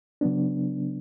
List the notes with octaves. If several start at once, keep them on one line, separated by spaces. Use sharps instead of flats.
C#3 F#3 B3 D4